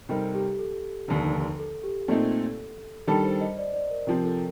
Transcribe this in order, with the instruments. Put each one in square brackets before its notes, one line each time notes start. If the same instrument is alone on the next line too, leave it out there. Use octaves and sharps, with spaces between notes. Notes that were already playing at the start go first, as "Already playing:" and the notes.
[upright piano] C3 G3 C4 D#4 A#4 [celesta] A4
[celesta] G4
A4
[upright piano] F1 D#2 D3
[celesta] A4
G4
[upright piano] A#2 A3 C4 D#4 [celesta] A4
[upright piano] D#3 G3 D4 A4
[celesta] C5
D#5
D5
D5
A#4
[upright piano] C3 F3 C4 [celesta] A#4
[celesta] A4